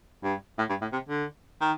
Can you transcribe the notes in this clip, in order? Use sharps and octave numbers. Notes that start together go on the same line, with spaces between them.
G2
A2
G2
A2
C3
D3
D#3